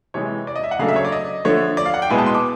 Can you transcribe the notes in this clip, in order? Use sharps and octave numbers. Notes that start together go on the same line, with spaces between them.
C3 E3 G#3 C#5
D5
D#5
E5
F#5
C#3 F#3 A3 D4 F5
E5
C#5
D5
D#5
D3 F3 A3 C#5
D5
F5
F#5
G5
B2 G#3 B3 E4 G#5
A5
C6
D6